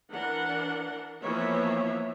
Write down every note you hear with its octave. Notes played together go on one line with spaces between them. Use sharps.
E3 D4 A#4 F#5
E3 F3 A#3 B3 C#5 E5